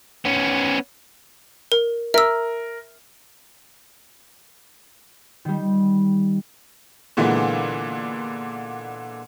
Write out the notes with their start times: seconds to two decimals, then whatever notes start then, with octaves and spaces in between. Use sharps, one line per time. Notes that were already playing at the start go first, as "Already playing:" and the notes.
0.25 B3 C#4
1.72 A#4
2.14 A#4 E5 E6
5.45 D#3 G3
7.17 A#2 D3 E3 G#3 A#3 B3